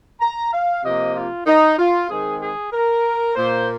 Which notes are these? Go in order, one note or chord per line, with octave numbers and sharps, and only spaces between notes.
A#5
F5
C3 F3 A#3 D#5
F4
D#4
F4
D#3 G#3 C4 G#4
G#4
A#4
A#2 A#3 C5